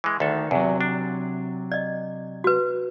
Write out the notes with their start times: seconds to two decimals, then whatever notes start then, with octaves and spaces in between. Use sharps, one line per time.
0.04 E3 G#3
0.20 D2 D#3 A4
0.51 E2 C3 F#3
0.81 D4
1.72 D5 D#5
2.44 F#4 B4